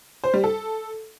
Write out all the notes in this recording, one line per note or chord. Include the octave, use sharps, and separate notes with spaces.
C5
G3
A4